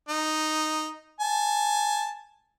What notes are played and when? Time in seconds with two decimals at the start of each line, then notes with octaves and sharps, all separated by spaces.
0.09 D#4
1.20 G#5 A5